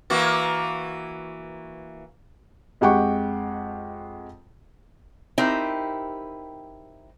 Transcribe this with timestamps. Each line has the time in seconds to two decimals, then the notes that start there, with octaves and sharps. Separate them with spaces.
0.10 E3 A#3 F#4
2.81 F2 G#3 G4 F#5 G5 C#6
5.38 C4 D#4 E4 G4 A#4